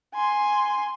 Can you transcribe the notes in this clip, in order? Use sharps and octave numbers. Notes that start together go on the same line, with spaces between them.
G#5 C6